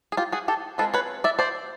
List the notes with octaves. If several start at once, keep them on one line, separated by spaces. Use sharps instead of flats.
G#4
F4 G4
F#4 G#4
G4 A4
G#3 C4 F4 A4 B4
B4 C#5
D5 E5
C5 D5